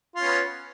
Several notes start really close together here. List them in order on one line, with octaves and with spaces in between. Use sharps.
F4 C#4 B3